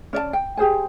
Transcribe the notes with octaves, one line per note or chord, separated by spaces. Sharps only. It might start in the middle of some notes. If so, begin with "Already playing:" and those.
C#4 D5 D#5 A5
G5
G4 G#4 C5 G#5